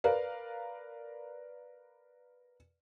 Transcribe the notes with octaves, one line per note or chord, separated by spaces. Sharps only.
A#4 B4 D5 F5